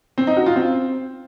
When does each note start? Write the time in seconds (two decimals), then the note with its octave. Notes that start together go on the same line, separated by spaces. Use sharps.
0.18 C4
0.27 D#4
0.37 F#4
0.46 F4
0.56 C4